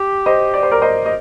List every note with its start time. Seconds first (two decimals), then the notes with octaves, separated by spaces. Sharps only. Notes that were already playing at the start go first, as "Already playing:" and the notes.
Already playing: G4
0.26 C5 D#5
0.54 D5
0.63 C5
0.71 A#4 D5
0.82 C5 D#5
1.06 D#5